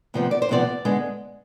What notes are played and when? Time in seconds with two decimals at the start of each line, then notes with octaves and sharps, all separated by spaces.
0.14 D2 C3 F3 B3
0.31 D5
0.42 C5
0.49 D2 C3 F3 B3 D5
0.85 D3 G#3 B3